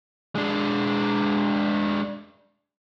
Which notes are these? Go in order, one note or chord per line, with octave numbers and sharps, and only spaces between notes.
G#3 D4